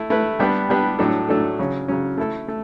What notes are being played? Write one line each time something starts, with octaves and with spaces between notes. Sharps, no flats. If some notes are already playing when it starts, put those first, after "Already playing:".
Already playing: A3 E4
A3 E4 B4
G3 B3 D4 G4 B4
G3 B3 D4 G4 B4
A2 F#3 A3 D4 A4
A2 F#3 A3 D4 A4
C#3 F#3 C#4
C#3 F#3 C#4
A3 E4 A4
A3